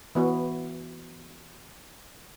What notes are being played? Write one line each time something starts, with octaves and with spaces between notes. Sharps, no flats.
E3 B3 F#4